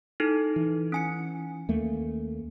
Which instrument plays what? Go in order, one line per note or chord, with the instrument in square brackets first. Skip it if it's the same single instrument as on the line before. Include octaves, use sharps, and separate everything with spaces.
[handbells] D#4 E4 A4
[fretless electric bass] E3
[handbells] C#4 G#5 C#7
[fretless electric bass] D#2 A3 A#3